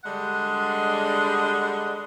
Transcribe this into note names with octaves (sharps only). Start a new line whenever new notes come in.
D3 G3 G#3 D4 D#5 F#5